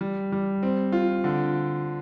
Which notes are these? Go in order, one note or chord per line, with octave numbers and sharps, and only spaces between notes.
G3
G3
C4
F4
D3